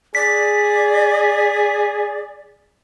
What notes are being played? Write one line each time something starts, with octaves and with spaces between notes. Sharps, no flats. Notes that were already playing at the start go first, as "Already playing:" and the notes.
G#4 D5 B6